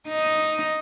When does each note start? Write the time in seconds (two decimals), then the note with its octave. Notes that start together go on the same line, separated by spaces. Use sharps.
0.08 D#4